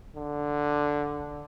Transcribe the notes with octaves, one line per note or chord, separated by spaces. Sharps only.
D3